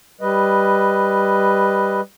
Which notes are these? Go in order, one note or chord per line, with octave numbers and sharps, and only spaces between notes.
G3 B4 D#5